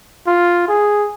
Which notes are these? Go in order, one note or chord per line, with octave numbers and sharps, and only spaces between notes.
F4
G#4